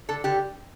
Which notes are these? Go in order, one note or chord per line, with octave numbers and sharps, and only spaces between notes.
D3 A4
D3 G4